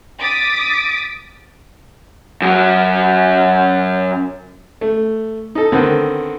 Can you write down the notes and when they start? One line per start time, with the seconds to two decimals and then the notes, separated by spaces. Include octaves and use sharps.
0.19 D6 D#6 A6 B6
2.42 F#2 F#3
4.81 A3
5.55 D#4 A4
5.72 D3 D#3 B3 C4